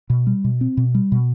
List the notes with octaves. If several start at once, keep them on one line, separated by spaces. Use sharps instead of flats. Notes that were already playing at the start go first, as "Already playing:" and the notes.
B2
G3
B2
C4
B2
G3
B2